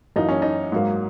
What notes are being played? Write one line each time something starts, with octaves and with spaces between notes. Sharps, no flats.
F#2 E3 A#3 D#4
C#4
D#4
G#2 F#3 A#3